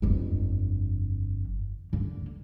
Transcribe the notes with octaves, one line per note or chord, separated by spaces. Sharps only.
G1 F2
D3 A#3